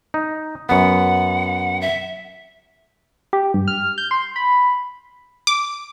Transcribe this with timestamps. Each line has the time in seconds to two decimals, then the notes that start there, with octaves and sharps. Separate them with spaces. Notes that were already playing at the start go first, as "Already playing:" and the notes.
0.14 D#4
0.69 F#2 B3 F#5
1.81 E5
3.33 G4
3.54 G2
3.68 F6
3.98 G6
4.11 C6
4.36 B5
5.47 D6